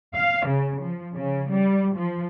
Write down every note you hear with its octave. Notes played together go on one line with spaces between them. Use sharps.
F5
C#3
F3
C#3
G3
F3